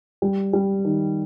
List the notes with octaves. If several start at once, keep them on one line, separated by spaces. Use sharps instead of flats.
G3
G3
D#3